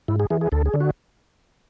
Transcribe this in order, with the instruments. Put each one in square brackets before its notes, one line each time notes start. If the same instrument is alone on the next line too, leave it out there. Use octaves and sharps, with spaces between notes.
[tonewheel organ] G#2 E4
G#4
E3 G#4
G#4
D2 A4
G#4
D3
F#4